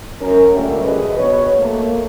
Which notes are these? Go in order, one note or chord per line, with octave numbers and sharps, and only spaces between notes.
F#2 C#4 A#4
G2 A#2 D3 G3 A3 C#4
F#2 D3 G#4 B4 D#5
B2 C#5
A3 A#3